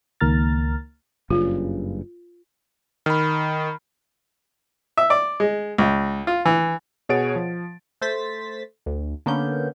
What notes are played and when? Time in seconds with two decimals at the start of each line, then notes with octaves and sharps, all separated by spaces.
0.20 C#2 D#3 A#3 A#5 F6 A6
1.30 F#1 G2 C#3 F4
3.06 D#3 B5 F6
4.97 E5
5.10 D5
5.40 G#3
5.78 C#2
6.27 F4
6.45 E3
7.09 B2 G#4 C#5 F#5 A6 D7
7.36 F3
8.01 A3 C5 A6 B6
8.86 D2
9.26 D3 A#3 B3 C#4 G6